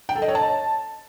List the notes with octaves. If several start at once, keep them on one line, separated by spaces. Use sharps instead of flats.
G5
A4
D#5
C#5
A5